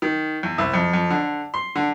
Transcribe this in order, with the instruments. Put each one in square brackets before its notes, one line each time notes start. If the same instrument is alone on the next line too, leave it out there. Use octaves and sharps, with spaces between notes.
[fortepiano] D#3
E2
C2
F2
F2
D3
C6
D3